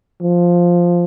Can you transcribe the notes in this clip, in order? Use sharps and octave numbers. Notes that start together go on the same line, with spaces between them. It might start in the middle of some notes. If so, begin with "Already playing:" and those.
F3